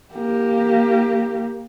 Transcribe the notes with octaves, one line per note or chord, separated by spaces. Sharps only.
A#3 G4